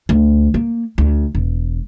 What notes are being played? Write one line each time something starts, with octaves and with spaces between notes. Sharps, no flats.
D2
A#3
D2
E1